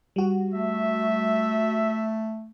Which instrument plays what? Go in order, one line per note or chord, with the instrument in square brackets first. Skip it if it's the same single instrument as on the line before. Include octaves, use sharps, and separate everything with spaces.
[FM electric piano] G3 F#4
[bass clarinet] A3 [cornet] E5